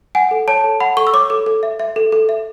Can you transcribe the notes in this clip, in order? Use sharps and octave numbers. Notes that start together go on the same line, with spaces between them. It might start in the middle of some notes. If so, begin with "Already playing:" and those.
F#5 G#5
A4
C#5 A5
A4
F#5 B5
A4 C#6
E6
C#5 D6
A4 D6
A4
E5
E5
A4
A4
E5